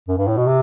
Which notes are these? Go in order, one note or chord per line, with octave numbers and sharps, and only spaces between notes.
F#2
G2
A2
B2
C3